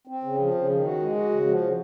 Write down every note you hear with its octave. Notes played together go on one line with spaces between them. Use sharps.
C4
C#3
F3
C#3
D#3
F#4
G#3
F#4
C#3
F3
C#3